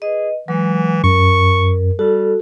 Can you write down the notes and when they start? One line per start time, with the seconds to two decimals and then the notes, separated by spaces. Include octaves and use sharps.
0.02 G#4 B4 D#5
0.48 E3 F#3 G#3 F#5
1.04 F#2 A#4 C#6
1.99 G3 F#4 A4